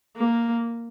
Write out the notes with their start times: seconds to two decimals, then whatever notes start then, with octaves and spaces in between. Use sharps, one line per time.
0.17 A#3